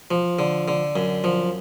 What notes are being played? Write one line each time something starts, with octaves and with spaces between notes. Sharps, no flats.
F3
D3
D3
F#2
F3